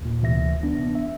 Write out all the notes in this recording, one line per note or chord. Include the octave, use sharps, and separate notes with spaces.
D#2 A#2
D2 C3 E3 E5 A#6
B3 D4
E5